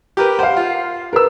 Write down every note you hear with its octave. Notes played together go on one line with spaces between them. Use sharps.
G4 A#4 B4
C5 F5 F#5
F4
A#4 B4 E6